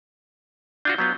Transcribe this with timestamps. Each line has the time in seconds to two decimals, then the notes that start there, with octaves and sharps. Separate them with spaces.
0.85 D4 F4 F#4 G6
0.98 F#3 B3 F4